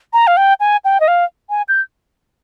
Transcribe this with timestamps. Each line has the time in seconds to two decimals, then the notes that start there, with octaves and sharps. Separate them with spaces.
0.13 A#5
0.27 F5
0.37 G5
0.60 G#5
0.85 G5
1.00 D#5
1.08 F5
1.50 G#5
1.68 G6